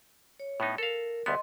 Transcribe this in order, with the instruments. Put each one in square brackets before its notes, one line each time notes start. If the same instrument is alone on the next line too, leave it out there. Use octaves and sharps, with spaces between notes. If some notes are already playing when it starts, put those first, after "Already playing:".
[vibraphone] C#5
[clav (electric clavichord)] A2 B3 D#4
[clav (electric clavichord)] A4 F5 [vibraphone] A#4
[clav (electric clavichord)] D2 G3 B3 [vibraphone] D#5 C6